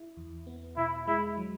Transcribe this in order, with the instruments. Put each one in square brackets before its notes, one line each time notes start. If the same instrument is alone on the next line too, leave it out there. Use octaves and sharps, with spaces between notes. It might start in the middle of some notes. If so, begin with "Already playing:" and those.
Already playing: [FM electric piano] E4
E2
B3
[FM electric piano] B2 [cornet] E4
[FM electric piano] G#3 [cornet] E4
[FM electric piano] F#3